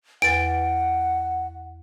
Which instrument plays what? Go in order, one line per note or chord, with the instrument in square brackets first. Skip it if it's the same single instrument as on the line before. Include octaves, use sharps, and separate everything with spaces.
[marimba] E2 B4 A6 [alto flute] F#5 [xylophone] D7